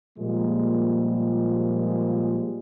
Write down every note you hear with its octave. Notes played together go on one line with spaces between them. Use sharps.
A#2 F3 G3 G#3 A#3